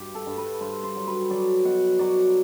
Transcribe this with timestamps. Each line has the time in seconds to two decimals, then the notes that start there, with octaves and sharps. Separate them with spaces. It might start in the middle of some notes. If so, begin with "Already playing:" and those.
Already playing: G2 G4
0.15 A4
0.27 G2
0.38 B4
0.61 G2 C5
0.84 C5
0.96 F#3
1.08 B4
1.30 F#3 D5
1.65 B2 F#5
1.99 F#3 D5